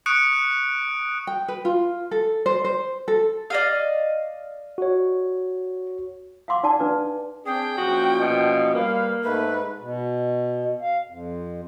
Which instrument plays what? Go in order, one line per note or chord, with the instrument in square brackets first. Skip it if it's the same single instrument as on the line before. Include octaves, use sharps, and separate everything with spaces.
[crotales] C#6 D#6 F#6 C#7 D7
[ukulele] G5
B4
F4
A4
C5
C5
A4
[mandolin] D5 D#5 F5
[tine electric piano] F#4 C#5
[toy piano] F5 F#5 C6 D6
D#4 D5 F#5 G#5 A5
D4 B4 D5
[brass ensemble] C4 D4 [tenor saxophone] G#4 [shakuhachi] G5
[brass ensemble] F#2 A#2 F3 [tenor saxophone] F#4
[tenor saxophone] B2
[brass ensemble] G3 F5 [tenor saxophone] A#3 [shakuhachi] B4
[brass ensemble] G#2 A3 [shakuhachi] B4
[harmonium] B2
F5
F2